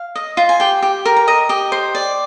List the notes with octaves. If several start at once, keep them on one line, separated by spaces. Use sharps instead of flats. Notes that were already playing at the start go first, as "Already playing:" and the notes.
Already playing: F5
D#5
F4
G#5
G4 G5
G4
A#4
A#5
D#5 A#5
G4 D#5
C5
D5